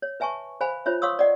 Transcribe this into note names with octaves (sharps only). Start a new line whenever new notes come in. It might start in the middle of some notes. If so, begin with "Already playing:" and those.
C#5
B4 E5 G#5 A5 C#6
C5 F5 G#5 B5
F4 C5 C#5 E5
C#5 F5 C6 C#6 D#6 E6
D5 D#5 F#5